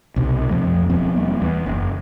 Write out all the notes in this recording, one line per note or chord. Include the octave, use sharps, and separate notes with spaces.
B1 C3
F2 F3 A3
E1 F3 B3 C4
E1 G3 A#3
E2
F#1